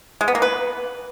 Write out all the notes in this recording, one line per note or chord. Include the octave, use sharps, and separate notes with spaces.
G#3
B3
A#3
B4